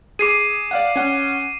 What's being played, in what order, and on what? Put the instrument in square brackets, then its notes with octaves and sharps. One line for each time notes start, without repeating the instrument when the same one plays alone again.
[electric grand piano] G#4 [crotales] D6 C7 D#7
[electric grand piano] D5 F5 F#5
C#4 F#5